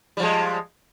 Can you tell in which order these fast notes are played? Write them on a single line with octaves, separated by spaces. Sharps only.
G3 F3 G#3